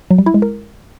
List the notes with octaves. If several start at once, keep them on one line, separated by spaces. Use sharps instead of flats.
F#3
G3
E4
G#3
A#4